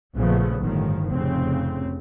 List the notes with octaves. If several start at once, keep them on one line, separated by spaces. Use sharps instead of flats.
A#1 C#3 F3 A3 B3
G1 A2 D#3 F3
F1 C#3 C4